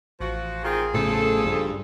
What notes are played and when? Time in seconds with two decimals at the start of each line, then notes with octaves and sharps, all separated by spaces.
0.20 A1 F3 F#4
0.64 D#3 C4 F4 G#4
0.94 A2 C#3 F3 A4
1.46 G2